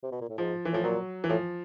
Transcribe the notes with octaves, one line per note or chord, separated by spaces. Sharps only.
C3
B2
A#2
A2
G#2 F3
E3
A2 F3
A#2 F#3
E3
A2 F3